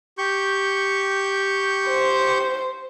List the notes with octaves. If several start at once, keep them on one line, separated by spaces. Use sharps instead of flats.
G4 C#6 G6
C5